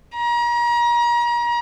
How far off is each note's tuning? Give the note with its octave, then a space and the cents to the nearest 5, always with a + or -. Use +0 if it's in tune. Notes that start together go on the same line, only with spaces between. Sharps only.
A#5 +35